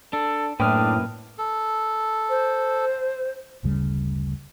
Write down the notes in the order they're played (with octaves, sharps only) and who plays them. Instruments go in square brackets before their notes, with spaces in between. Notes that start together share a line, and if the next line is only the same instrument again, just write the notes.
[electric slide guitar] D4 [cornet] A4
[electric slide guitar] F#2 A#3 B4 [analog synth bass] A2 [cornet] D4 [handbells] G5 D#6 F6
[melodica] A4
[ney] C5
[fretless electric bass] F#1 D2 C#3 G3